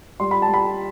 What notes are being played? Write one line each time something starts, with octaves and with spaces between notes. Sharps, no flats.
G3 C6
B5
A5
G3
B5